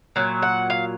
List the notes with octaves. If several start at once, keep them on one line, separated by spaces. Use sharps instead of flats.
A#2 F#3
F#5
F5